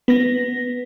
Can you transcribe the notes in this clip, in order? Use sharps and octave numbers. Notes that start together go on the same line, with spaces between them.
B3 A#6